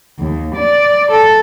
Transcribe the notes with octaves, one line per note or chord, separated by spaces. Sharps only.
D#2
D5
A4